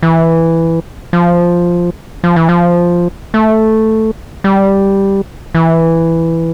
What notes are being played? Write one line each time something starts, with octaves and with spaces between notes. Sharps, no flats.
E3
F3
F3
E3
F3
A3
G3
E3